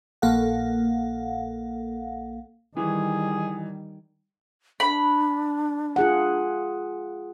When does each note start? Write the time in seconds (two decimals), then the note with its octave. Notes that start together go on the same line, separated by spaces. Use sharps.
0.22 A#1 A#3 A4 F5 F#5
2.77 D#3 E3 G3 G#4
4.80 D4 B5
5.96 F4 G#4 F#5